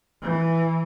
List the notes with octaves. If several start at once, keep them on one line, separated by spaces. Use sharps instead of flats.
E3